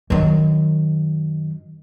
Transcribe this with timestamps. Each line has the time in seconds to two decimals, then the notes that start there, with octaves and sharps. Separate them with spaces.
0.10 F#2 D#3